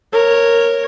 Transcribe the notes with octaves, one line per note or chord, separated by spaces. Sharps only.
A#4 C#5